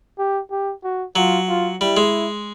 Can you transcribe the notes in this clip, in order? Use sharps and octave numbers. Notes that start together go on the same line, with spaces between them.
G4
G4
F#4
F#3 F4
F4
G3 E4
G#3